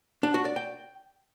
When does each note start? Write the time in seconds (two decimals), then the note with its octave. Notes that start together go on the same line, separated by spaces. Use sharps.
0.23 D4
0.34 F#4
0.45 D5
0.56 G5